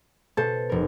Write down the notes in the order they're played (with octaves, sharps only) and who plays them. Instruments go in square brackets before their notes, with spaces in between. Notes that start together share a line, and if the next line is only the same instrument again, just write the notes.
[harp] B2 [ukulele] A4 C5
[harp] F1 A#4